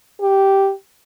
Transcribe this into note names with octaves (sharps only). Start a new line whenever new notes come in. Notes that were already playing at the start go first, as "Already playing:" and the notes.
G4